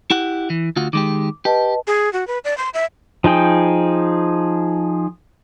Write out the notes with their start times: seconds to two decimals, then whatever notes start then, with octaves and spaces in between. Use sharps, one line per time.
0.10 E4 G4 F#5
0.50 E3
0.76 D2 F4 F#4
0.93 D#3 G#3 G4 D6
1.45 G4 B4 D#5 A5
1.87 G#4
2.13 F#4
2.27 B4
2.44 D5
2.58 C6
2.74 E5
3.24 F3 D#4 G#4 G5